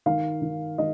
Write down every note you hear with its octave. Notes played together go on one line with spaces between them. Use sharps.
D#3 F5
D#3
D#3 D#5